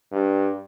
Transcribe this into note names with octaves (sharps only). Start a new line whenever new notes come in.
G2